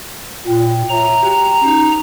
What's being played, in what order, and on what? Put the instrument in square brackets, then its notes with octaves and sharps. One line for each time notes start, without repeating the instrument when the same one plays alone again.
[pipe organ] A#2 [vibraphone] F4 G5
[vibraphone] C#5 E5 [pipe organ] A#5
[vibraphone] F#4 G4 G5
C#4 D#4